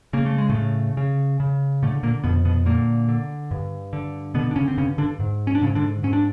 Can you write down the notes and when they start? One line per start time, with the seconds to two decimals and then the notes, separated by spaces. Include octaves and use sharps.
0.13 C#3 A#3
0.26 A3
0.38 G#3
0.49 A2 A3
0.55 C#3
0.97 C#3
1.40 C#3
1.83 A2 D3 A3
2.03 A#2 A#3
2.24 F2 B2 B3
2.45 B2 B3
2.66 A#2 D3 A#3
3.09 D3
3.51 G2
3.93 D3
4.34 B2 D3 B3
4.51 D4
4.56 C#3 C#4
4.68 C4
4.77 G2 C#3 C#4
4.98 D3 D4
5.20 G#2
5.47 C#4
5.55 D4
5.62 G#2 C#3 C#4
5.75 D3 D4
6.03 G#2 C#4
6.13 D4